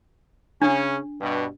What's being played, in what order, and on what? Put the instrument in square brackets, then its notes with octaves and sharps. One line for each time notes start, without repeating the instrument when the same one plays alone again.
[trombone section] C#3 C#4 [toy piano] D4
[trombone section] G2 B2